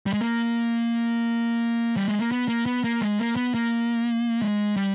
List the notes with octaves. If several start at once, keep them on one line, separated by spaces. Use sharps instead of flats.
G3
G#3
A#3
G3
G#3
A#3
B3
A#3
B3
A#3
G#3
A#3
B3
A#3
G#3
G3